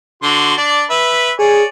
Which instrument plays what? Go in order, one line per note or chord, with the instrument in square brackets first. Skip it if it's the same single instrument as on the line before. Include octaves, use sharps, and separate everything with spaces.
[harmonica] D3 F#4 C6
D4 D5
B4 E5
[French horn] G#4 [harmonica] C#5 D5 G#5